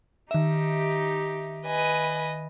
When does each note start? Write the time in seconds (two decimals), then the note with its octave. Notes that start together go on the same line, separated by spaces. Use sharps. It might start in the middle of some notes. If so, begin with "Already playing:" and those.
0.31 D#3 D#4 G4 E5
1.65 B4 D#5 G#5